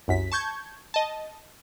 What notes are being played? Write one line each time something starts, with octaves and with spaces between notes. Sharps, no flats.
C2 F#2 B6
A5 C#6 G6 G#6
D#5 A5